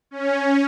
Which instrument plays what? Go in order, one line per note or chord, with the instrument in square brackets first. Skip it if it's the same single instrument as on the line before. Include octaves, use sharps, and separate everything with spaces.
[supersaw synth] C#4